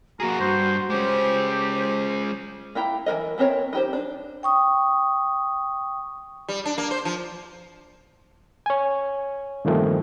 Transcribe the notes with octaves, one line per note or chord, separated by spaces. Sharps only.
A#3 F#4 G#4 A#5
G2 C5
G#3 C#4 G4 C5
C5
A#3 E4 G5 A#5
E3 F3 A#4 D#5
E3 B3 C4 A#4 C#5
D#4 G4 C5
D4
G5 C#6 D#6
G3
D4
A#3
C5
F3
C#5 G#5
G2 A#2 D#3 F3 A3 C4